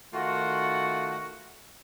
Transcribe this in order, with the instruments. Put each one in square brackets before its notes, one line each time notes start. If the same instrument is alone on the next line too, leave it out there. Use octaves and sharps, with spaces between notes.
[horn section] D#3 A3 F4 F#4